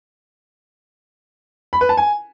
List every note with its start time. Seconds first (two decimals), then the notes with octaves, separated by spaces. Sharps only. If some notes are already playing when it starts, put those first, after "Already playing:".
1.73 B5
1.81 B4
1.89 A5
1.97 G#5